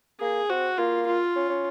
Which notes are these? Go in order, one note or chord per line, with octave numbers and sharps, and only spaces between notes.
A#3 G#4
C4 F#4
A#3 F4
F4
C#4
C#4